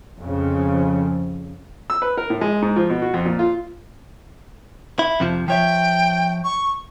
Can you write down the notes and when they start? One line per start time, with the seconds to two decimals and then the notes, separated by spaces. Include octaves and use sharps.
0.19 F2 C#3
1.90 E6
2.02 B4
2.17 A#4
2.30 A2
2.41 G#3
2.62 G#2
2.76 F3
2.90 B2
3.02 F#4
3.14 F2
3.25 A#2
3.39 F4
4.99 E4
5.20 F2 C3 F3
5.48 F3 C#5 E5 G5
6.44 C#6